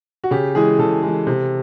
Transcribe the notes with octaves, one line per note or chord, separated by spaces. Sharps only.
F#4
C#3 G4
E3 G#3 G#4
C#3 A4
E3 G#3
C3